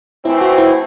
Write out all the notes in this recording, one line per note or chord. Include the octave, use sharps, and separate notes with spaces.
A2 E3 C4 E4
F#4
E4